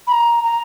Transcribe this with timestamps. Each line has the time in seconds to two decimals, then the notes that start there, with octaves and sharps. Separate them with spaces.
0.07 B5
0.11 A#5
0.43 A#5